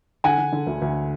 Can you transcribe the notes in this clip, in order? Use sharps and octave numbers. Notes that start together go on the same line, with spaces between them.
D3 F#5 G#5
D3
D3
D2
D2